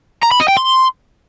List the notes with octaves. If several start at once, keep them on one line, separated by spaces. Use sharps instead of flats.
A#5
B5
D#5
G5
C6